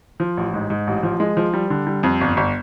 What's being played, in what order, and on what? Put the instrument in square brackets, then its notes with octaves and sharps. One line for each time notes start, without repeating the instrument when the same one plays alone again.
[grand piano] F3
A1
G#2
G#2
A1
F3
G#3
F3
G3
D3
G3
F2
G1
G1